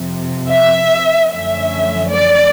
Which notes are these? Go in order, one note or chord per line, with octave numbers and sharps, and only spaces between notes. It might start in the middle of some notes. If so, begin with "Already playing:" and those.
Already playing: F2 C3 F3
E5
F#2 D3 F3 A3 C#4 E5
D5